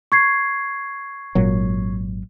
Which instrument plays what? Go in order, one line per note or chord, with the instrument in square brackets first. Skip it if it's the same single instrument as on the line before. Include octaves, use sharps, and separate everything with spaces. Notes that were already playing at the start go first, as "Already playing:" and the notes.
[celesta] C#6 G#6 C7
[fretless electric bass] G#1 A#2 F#3